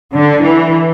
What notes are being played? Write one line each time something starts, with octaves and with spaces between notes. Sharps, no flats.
D3
E3